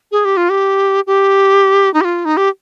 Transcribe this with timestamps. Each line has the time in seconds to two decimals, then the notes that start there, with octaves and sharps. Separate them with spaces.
0.12 G#4
0.25 G4
0.37 F4
0.49 G4
1.07 G4
1.94 D#4
2.01 G4
2.04 F4
2.25 D#4
2.37 G4